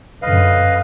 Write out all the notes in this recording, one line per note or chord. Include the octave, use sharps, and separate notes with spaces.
F#2 D3 B4 D#5 F5